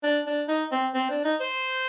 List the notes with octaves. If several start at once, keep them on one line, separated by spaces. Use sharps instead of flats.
D4
D4
D#4
C4
C4
D4
D#4
C5